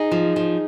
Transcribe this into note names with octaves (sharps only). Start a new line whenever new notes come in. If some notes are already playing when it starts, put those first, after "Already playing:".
Already playing: D#4 G#4
F3
F3